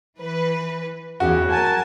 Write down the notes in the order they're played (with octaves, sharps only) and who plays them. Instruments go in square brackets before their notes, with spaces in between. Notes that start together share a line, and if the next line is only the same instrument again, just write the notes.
[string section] E3 B4
[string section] E2 C#3 G4 [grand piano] F#4
[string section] A#4 G#5 A5